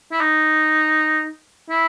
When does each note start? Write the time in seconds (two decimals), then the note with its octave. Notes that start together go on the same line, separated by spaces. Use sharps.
0.12 E4
0.21 D#4
1.70 E4